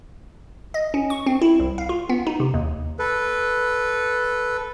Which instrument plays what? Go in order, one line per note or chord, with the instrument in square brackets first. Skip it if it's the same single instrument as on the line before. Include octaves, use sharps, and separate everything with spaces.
[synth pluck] D#5
C#4
C#6
C4
E4
C2
F5
F4
B3
D#4
C3
D#2
[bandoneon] A4 B4